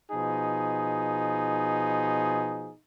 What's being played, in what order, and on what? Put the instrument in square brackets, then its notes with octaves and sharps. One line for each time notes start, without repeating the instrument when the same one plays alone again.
[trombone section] B2 F3 G#4 [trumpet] D#4